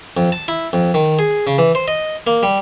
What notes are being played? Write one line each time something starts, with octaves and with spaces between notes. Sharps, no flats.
F2
A5
E4
F2
D#3
G#4
C#3
E3
C5
D#5
A#3
G3